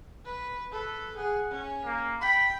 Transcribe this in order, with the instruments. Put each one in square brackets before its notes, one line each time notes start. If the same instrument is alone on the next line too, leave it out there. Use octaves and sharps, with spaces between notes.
[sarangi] B4
[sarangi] A4 [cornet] B4
[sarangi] G#4 [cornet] F#5
[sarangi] C#4
[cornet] A#3
[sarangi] G5 [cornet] B5